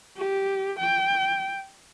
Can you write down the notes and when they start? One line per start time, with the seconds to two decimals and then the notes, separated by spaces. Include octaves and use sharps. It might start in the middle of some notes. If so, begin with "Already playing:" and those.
0.18 G4
0.80 G5